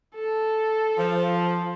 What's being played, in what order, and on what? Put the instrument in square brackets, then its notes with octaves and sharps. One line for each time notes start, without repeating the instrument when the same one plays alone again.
[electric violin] A4
[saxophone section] F3